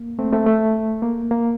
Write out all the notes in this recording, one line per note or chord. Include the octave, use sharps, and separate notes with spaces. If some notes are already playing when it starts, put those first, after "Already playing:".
Already playing: A#3
A3 C4
A3 C4
A3
A#3
A#3